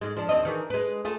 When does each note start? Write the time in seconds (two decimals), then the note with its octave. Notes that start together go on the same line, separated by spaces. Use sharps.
0.01 G#2 G#3
0.17 F3 D4
0.29 D#2 C4 D#5
0.45 D#3 E3 G#4
0.70 G#3 B4
1.05 A3 F4 G#4